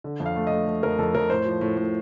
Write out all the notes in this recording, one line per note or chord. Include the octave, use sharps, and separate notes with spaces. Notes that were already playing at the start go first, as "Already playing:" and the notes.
D3
F2
F5
A3
A3 D#5
A3
F2 A#4
F2 A4
F2 A#4
A2 C5
F3
A2
A2